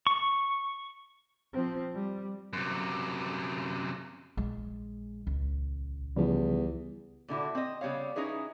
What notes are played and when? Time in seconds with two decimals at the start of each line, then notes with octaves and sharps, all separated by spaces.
0.07 C#6
1.53 F3 C4
1.95 G3
2.53 F#2 C3
4.37 A#1 G#3
5.27 C#2
6.16 E2 C#3 F3 G3
7.28 A#2 D3 E4 F#4
7.55 C4 D#5
7.81 C#3 G3 B3 C#5 F5
8.16 C#4 D#4 E4 G#4 B4